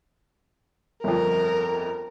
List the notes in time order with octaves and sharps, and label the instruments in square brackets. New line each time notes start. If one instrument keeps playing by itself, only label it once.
[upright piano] G1 F2 [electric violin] A#4